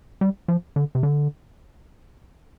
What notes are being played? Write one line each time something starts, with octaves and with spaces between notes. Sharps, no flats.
G3
F3
D3
C3
D3